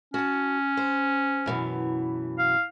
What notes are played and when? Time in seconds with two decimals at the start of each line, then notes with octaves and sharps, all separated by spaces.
0.14 C#4 F#4 A5
0.77 C5
1.46 F#2 B2 E3
2.39 F5